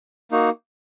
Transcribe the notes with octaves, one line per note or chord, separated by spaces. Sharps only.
A#3 D#4 F#4